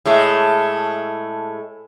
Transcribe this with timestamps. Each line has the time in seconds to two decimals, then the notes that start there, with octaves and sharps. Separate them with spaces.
0.06 A2 G#3 A3